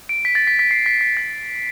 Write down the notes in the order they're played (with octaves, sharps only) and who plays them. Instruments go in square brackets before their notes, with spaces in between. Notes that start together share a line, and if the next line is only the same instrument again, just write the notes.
[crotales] D7
B6
A6
B6
B6
C7
B6
B6
A6